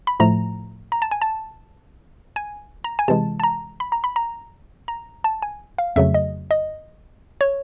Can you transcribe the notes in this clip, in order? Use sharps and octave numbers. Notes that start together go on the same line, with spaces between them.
B5
A2 F3 A3 A#5
A#5
A5
G#5
A5
G#5
A#5
G#5
C3 E3 G#3 A5
A5
A#5
B5
A#5
B5
A#5
A#5
A5
G#5
F5
F2 C#3 F#3 A3 E5
D#5
D#5
C#5